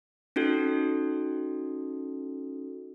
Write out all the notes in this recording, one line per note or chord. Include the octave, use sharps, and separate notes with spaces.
C#4 D#4 F#4 A4